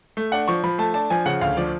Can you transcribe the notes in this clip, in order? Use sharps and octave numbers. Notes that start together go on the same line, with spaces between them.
A3
D4 F#5
F3 C#6
F3 B5
A3 A5
D4 A5
F3 G#5
C#3 F#5
D2 F5
F3 D5